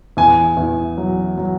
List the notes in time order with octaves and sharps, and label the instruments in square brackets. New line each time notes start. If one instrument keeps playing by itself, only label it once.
[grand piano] E2 G#5
E2
F#3
F#3